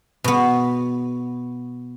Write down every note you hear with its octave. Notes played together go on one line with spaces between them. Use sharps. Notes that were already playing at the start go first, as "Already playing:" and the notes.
B2 B3